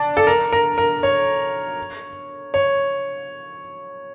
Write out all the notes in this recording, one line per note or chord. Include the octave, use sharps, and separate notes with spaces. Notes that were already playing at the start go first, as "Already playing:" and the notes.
Already playing: D4
A4
A#4
A#4
A#4
C#5
C#5